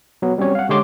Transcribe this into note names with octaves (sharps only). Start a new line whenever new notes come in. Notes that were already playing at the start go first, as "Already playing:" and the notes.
F#3 B3
G3 C4 C#4 C#5
F5 F#5
D3 G#3 G4 C#5 C6 D6